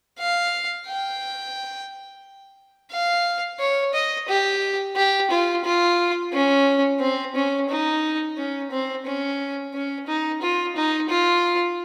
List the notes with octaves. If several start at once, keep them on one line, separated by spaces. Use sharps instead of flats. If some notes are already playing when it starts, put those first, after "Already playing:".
F5
G5
F5
C#5
D#5
G4
G4
F4
F4
C#4
C4
C#4
D#4
C#4
C4
C#4
C#4
D#4
F4
D#4
F4